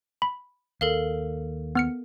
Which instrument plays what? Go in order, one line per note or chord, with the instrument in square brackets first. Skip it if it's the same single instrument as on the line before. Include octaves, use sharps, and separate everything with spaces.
[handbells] B5
[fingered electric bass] D#2 [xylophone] A4 A#4 F5
[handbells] B3 F6 C#7